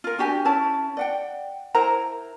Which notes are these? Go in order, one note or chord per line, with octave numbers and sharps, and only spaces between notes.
F4 A#4
D4 F#4 G4 G#5
C#4 E4 C#5 A5
D5 F#5 G5
E4 A#4 C5 A#5